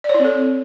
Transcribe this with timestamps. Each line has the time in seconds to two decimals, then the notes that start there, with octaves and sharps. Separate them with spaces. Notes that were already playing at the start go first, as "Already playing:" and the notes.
0.04 D5
0.09 C#5
0.14 E4
0.19 C4
0.25 A4